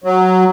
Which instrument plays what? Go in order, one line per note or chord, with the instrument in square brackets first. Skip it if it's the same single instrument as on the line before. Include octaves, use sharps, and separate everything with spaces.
[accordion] F#3